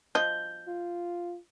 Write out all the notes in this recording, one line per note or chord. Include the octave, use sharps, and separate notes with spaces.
F3 D#5 G6
F4